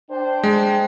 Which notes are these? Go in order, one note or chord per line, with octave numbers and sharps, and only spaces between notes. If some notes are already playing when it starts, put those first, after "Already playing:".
D4 C5 G5
G#3